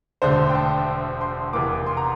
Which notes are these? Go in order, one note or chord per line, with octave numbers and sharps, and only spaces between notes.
E1 D2 D3 C5
G5
A5
C6
F1 E2 E3 A#3 D6
C6
A#5